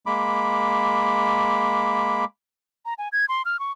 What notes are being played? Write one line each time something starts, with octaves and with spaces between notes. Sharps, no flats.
G#3 A#3 B5 D6
A#5
G#5
G#6
C6
F6
C#6